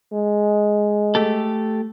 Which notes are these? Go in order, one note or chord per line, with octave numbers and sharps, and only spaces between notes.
G#3
A3 G4 A4